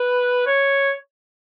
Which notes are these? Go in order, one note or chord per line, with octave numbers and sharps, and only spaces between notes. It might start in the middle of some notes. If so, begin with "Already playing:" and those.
Already playing: B4
C#5